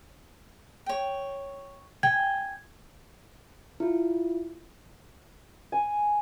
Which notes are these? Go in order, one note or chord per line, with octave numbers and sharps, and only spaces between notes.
C#5 G5
G5 G#5 G#6
E4 F4
G#5